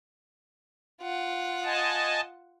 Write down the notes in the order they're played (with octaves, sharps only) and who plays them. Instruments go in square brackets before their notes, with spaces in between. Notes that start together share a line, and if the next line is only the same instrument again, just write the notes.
[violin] F4 F#5
[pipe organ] D#5 G#5 A5